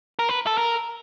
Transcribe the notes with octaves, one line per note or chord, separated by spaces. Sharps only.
A#4
B4
A4
A#4